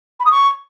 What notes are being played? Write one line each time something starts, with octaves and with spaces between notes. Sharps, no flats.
B5
D#6
C#6